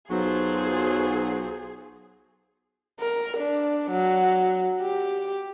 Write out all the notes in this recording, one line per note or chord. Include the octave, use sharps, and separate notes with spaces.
B1 F#3 F4 G#4 A4 C5
A#4
D4
F#3
G4